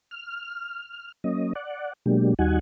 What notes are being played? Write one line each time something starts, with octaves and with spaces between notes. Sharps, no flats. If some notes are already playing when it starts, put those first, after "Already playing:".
F6
F#3 A#3 C#4 D#5
D5 F#5
B2 F#3 G#3 A#3 D4 G4
D#2 G3 D#4 F#4 F#5 G#5